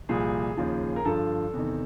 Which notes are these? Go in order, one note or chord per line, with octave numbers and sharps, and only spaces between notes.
C2 A#2 F3 G#4
D#2 C#3 F3
A#4
G2 D3 F3 A4
E2 C3 D#3